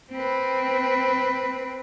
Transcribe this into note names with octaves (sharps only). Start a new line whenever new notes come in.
C4 B4